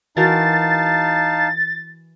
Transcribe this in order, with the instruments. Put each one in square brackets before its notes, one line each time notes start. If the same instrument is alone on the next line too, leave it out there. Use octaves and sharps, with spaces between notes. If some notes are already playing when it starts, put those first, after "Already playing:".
[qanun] E3 F#4 A#4 [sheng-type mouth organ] D#4 F5 A5 [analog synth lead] A6